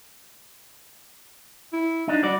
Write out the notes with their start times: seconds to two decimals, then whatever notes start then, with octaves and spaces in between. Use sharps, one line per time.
1.73 E4
2.08 D4 D#4
2.23 G3 F#4 D5